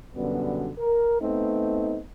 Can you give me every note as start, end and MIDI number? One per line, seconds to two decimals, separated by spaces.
0.15 0.70 42
0.15 0.70 47
0.15 0.70 50
0.15 0.70 55
0.15 0.70 59
0.78 1.18 70
1.20 2.00 57
1.20 2.00 59
1.20 2.00 60
1.20 2.00 63